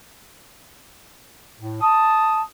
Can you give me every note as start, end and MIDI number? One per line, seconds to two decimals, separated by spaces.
1.60 1.79 45
1.82 2.41 81
1.82 2.42 87